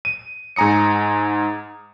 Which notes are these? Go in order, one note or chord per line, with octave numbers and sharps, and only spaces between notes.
D#7
G#2 G#5 A#5 D#6 C#7